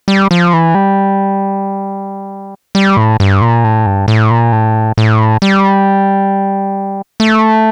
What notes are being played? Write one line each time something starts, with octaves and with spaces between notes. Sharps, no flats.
G3
F3
E3
G3
G3
A2
G2
A#2
A2
G2
A2
A#2
A2
A2
G3
A3